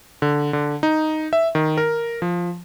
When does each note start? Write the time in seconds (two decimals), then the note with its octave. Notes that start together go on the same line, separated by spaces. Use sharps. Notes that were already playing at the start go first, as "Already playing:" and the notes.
0.22 D3
0.53 D3
0.83 D#4
1.33 E5
1.55 D#3
1.77 A#4
2.22 F3